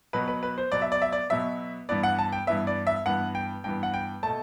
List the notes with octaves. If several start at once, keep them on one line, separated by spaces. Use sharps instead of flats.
B2 F#3 B3 B4
B4
B4
C5
B2 F#3 B3 D5
E5
D5
E5
D5
B2 F#3 B3 E5
G2 E3 B3 D5
F#5
A5
G5
G2 E3 B3 E5
D5
E5
G2 E3 B3 F#5
G5
G2 E3 B3 G5
F#5
G5
B2 A3 A5